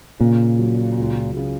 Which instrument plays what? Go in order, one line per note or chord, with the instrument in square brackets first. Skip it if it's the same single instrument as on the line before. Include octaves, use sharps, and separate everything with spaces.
[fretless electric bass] A#2 [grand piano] C#3
[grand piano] F#3
C#2
C#3